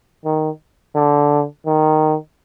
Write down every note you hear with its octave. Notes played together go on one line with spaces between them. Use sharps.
D#3
D3
D#3